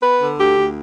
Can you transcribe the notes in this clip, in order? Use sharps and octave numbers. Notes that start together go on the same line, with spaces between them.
B3 B4
D3
D2 G4
D2